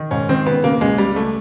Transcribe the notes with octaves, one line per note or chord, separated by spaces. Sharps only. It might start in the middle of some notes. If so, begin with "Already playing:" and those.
Already playing: D#3
G#2 C#4
D#3 C4
C#3 B3
C#3 A#3
C#2 G#3
C#2 G3
A3